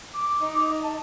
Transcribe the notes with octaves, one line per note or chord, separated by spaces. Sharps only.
D6
D#4
D#5
A5